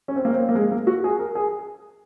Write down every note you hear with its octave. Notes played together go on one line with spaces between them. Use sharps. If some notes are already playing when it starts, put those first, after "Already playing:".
C#4
C4
A#3
C4
A#3
G#3
A#3
F#4
G#4
A#4
G#4